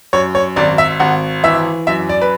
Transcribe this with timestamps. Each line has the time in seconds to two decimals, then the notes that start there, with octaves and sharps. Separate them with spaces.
0.13 F#2 C#5
0.35 C#5
0.56 G#1 D5
0.78 E5
1.00 G#1 F#5
1.43 E3 E5
1.87 F#2 E5
2.09 D5
2.22 B4